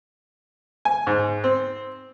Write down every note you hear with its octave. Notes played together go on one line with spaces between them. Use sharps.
G#5
G#2
C4